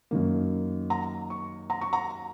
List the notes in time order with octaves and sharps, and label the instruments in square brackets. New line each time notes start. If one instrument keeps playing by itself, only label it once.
[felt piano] F#2 D#3 A#3
A#5
C#6
A#5
C#6
A#5